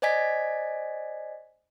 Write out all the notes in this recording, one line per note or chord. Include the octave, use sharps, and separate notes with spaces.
C5 D5 D#5 G#5 G#6 B6